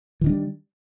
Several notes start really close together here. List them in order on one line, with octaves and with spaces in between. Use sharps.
E3 D#3 D4 G3